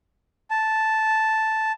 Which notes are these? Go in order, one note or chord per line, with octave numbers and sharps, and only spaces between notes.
A5